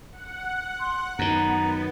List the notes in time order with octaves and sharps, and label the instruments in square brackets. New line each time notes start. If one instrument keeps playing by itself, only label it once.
[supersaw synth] F#5
[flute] C6
[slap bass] F#2 D#3 [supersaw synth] B3 [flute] A#5